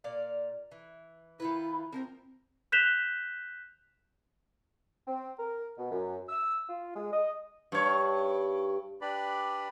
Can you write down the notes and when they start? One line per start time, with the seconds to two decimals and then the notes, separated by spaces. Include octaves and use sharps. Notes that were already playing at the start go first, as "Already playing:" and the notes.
0.04 A#2 D5 F5
0.71 E3
1.40 D#3 E4 F4 B4
1.93 F3 C4 A#4 G5
2.72 F#6 G6 B6 E7 F7 G7
5.08 C4
5.39 A#4
5.78 B2
5.92 F#2
6.29 E6
6.69 F4
6.96 G#3
7.13 D#5
7.72 G2 C#5
9.01 D4 G4 B4 D5 B5